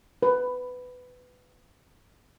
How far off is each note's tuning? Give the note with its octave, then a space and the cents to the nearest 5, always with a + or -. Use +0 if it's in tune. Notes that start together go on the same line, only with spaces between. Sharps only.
B4 +15